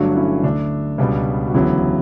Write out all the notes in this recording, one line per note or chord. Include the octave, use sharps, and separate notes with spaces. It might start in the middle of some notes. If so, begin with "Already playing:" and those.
Already playing: G1 G2 D3 F#3 A3 D4 F#4
C#4 E4
D2 D3 A3 D4
C#2 B2 G3 B3
F#4
E1 D2 C#3 F#3 B3 E4 G4